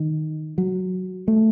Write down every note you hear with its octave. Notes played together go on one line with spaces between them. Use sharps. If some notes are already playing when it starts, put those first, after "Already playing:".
Already playing: D#3
F#3
A3